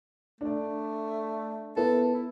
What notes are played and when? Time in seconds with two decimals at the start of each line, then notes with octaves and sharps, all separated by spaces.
0.41 A3 D4 D5
1.76 B3 E4 A4
2.13 E4